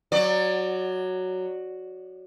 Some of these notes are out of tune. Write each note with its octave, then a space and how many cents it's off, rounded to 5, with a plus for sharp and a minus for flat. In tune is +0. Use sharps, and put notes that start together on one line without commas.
F#3 +0 D5 +20